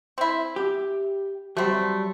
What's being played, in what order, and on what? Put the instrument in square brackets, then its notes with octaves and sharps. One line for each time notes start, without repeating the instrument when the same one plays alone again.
[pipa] C4 E4
[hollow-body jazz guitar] G4
[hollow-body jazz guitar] F#3 G3 [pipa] A3 C4